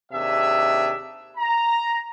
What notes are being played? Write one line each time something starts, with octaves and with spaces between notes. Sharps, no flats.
D#2 C3 D4 G#4 E5
A#5